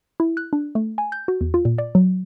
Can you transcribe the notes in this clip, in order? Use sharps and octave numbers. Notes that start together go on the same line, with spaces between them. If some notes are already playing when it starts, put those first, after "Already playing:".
E4
F#6
D4
A3
G#5
G6
F#4
E2
F4
A#2
D5
F#3